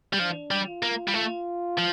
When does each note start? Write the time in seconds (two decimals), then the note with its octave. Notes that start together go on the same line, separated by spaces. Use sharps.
0.13 G3
0.19 F3 D4
0.51 G3
0.67 F4
0.83 A#3
1.08 G3
1.14 A3 F4
1.78 F3